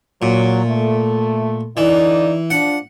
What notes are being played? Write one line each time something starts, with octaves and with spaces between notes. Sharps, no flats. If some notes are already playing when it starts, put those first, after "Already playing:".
A#2 F#3
A3
D3 E3 D#4 D5
F3 D4 F#5